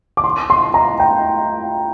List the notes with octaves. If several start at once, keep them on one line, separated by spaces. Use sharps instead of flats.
D6
C6
C6
A#5
G5